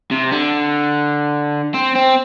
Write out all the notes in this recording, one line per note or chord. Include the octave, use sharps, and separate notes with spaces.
C3
D3
C4
C4